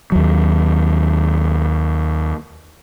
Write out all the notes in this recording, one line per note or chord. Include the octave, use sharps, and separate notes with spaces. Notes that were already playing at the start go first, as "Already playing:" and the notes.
D#2 F#3